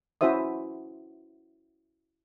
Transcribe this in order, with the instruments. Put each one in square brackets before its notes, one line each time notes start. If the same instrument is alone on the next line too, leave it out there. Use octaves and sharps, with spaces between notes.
[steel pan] C#4 E4 F#4 C5 E5 D#6